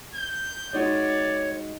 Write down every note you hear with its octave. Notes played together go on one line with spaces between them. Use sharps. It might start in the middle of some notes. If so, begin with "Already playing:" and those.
G6
G#3 D#4 F#4 C#5 D5